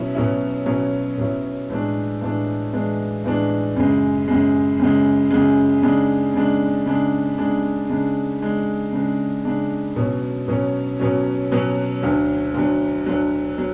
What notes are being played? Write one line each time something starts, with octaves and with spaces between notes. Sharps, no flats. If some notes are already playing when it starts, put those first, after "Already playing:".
Already playing: B2 F#3 C#4 E4
B2 F#3 C#4 E4
B2 F#3 C#4 E4
B2 F#3 C#4 E4
A2 E3 G#3 D4
A2 E3 G#3 D4
A2 E3 G#3 D4
A2 E3 G#3 D4
F#2 C#3 G#3
F#2 C#3 G#3
F#2 C#3 G#3
F#2 C#3 G#3
C#3 G#3 D4
C#3 G#3 D4
C#3 G#3 D4
C#3 G#3 D4
C#3 G#3 D4
C#3 G#3 D4
C#3 G#3 D4
C#3 G#3 D4
B2 F#3 C#4
B2 F#3 C#4
B2 F#3 C#4
B2 F#3 C#4
D2 D3 F#3
D2 D3 F#3
D2 D3 F#3
F#3